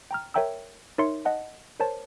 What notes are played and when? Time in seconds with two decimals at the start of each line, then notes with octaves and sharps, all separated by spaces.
0.11 G5 A#5 F6
0.34 A#4 C#5 E5 G5 A#5 E6
0.98 D#4 A#4 C#5 E5 C6 C#7
1.25 D#5 F#5 A5
1.80 A#4 C5 C#5 A5